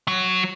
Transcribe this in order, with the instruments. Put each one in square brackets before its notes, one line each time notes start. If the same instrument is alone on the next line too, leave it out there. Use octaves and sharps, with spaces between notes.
[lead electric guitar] F#3